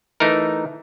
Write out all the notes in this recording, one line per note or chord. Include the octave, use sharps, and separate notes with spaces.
E3 A3 D#4 A#4